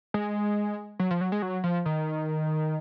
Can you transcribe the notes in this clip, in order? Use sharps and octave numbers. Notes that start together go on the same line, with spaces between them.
G#3
F#3
F3
F#3
G#3
F#3
F3
D#3